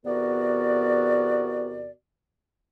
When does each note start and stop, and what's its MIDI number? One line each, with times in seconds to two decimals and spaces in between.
0.05 1.90 40
0.05 1.90 48
0.05 1.90 59
0.05 1.90 66
0.05 1.90 70
0.05 1.90 74